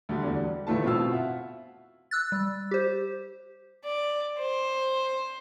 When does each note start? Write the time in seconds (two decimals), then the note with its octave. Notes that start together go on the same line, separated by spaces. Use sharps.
0.09 D2 D3 G3
0.23 E2 D3
0.36 G3
0.67 G1 A2 E3 A3 F4 A5
0.84 B2 C4 E4 F4 F5 E6
1.11 E5 F#5
2.11 E6 F#6 A6
2.32 G3
2.71 G4 C5
3.84 D5
4.38 C5